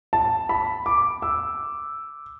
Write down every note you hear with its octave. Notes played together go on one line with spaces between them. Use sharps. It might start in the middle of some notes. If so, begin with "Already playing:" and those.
A5
B5
D6
E6